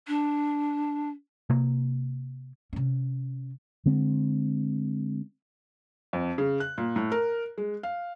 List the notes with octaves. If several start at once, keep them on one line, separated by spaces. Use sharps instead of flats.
D4
C3 A#3
C3 C#4
D3 G#3 C4
F2
C#3
F#6
A#2
A2
A#4
G#3
F5